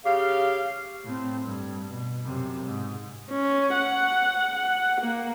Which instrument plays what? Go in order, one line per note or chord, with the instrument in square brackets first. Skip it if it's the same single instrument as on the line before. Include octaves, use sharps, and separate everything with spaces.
[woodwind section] C#3 G4 F5
[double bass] A2 C4
G2
B2
F#2 C3
G#2
[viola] C#4
F#5
F#5
A#3